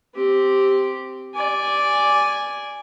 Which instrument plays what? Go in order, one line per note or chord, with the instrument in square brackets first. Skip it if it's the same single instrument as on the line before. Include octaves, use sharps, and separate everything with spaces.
[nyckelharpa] C4 G4
D5 G#5